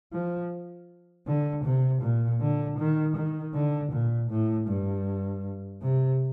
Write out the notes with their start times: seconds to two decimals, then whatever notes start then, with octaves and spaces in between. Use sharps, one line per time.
0.13 F3
1.27 D3
1.64 C3
2.02 A#2
2.40 D3
2.78 D#3
3.16 D#3
3.54 D3
3.92 A#2
4.30 A2
4.68 G2
5.82 C3